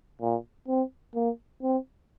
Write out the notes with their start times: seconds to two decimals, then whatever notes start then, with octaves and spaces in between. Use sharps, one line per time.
0.21 A#2
0.68 C4
1.15 A#3
1.63 C4